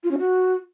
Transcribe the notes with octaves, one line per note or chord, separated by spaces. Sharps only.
F4
C#4
F#4